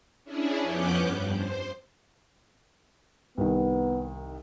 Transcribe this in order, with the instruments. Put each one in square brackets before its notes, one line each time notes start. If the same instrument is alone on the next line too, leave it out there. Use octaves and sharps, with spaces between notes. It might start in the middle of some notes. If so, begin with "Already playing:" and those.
[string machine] C#4 D4 E4 G#4
F2 B3 C#4 D6 F#6 G6
G2
C5
[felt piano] C2 D#3 [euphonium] B3